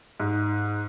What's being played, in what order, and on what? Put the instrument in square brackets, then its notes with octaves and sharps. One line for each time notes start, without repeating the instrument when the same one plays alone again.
[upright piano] G#2